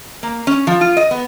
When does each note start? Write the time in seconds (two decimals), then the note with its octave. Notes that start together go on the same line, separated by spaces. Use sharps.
0.23 A#3
0.47 C#4
0.67 F3
0.81 F4
0.97 D#5
1.11 B3